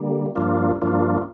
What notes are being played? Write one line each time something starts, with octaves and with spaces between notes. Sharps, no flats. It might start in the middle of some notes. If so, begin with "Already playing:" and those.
Already playing: D3 G3 A#3
G2 F3 A#3 D4 F4
G2 F3 A#3 D4 F4